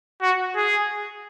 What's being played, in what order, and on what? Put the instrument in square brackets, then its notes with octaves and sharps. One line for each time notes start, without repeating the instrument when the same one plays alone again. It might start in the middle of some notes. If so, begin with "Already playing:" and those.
[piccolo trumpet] F#4
G#4